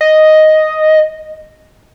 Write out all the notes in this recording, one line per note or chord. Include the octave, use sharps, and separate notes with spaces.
D#5